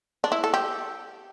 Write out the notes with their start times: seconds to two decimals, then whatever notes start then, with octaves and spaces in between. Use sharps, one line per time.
0.24 D4
0.32 E4
0.44 A4
0.54 G4